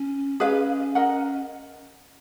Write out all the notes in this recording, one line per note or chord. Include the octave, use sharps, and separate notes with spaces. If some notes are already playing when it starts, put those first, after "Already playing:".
Already playing: C#4
C#4 G#4 B4 F5
A#4 D#5 F#5